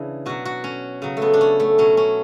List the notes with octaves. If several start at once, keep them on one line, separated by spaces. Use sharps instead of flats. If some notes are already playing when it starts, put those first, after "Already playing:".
Already playing: C#3 E3 D4
B2 F#3 F#4
F#4
C#4
C#3 F#3
A3
B3
D4
C#4
A3
B2 F#3 C#4
C#4